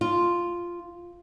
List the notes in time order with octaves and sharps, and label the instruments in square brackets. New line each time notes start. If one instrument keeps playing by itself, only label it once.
[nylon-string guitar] F4